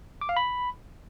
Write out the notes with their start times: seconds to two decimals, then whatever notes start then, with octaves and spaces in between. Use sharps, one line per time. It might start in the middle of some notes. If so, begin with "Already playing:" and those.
0.21 D6
0.29 F5
0.37 B5